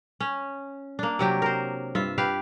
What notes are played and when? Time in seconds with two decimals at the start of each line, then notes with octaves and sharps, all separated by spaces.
0.21 C#4
0.99 A#3 D4
1.19 C3 F#3 G4
1.42 A#4 C5
1.95 G2 F4 E5
2.18 G4 B4 F5